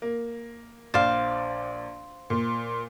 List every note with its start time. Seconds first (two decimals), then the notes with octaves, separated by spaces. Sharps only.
0.02 A#3
0.94 A#1 C5 D5 F5 A6
2.30 A#2